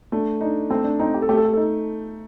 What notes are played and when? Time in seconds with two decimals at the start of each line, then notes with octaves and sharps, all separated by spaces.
0.12 A3 D4
0.41 D4 D#4
0.70 A3 C4
0.84 D4
0.99 C4 D#4
1.14 G4
1.22 A4
1.29 A3 G4
1.37 A4
1.45 G4
1.53 A4
1.57 D#4